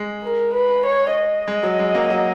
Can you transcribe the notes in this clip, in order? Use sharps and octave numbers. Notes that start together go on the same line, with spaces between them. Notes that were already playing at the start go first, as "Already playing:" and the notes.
Already playing: G#3
A#4
B4
C#5
D#5
G#3
F#3
G#3
F#3 A#3
F#3